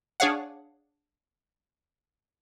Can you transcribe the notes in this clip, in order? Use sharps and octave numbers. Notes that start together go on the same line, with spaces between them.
D4 G#4 C#5 F5 F#5